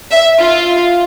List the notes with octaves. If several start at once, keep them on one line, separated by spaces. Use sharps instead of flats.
E5
F4